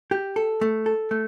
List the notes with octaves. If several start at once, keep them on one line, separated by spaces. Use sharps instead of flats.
G4
A4
A3
A4
A3